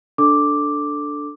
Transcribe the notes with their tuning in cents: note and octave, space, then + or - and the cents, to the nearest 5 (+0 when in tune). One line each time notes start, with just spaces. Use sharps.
D4 +0 A4 +0 D6 +0